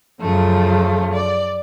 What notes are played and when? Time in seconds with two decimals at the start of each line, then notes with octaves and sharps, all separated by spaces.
0.20 F#2 C#3 F3 A3
1.14 D5